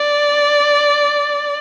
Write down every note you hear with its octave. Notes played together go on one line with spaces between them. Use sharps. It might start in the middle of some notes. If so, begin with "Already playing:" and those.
Already playing: D5